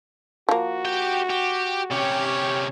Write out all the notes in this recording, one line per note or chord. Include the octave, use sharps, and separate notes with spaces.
F3 A#3 F#4
G4 G5
G4
C3 C#4 G4 C#5